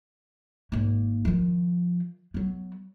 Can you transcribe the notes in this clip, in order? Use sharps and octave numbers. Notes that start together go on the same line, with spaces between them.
G#1 A#3
D#3 F3
F#3 B3